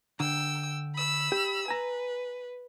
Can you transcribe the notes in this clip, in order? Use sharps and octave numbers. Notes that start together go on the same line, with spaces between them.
D3 G5 E6
B5 E6
G4
B4 G#5 A#5